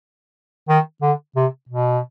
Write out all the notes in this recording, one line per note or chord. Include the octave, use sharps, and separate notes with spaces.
D#3
D3
C3
B2